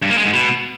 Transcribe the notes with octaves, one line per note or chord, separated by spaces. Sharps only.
G2
A#3
G#3
G#2
B2